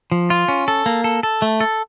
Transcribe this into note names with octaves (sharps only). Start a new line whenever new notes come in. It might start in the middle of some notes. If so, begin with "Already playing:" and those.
F3
F4
C#4
A4
A#3
A4
A4
A3
A4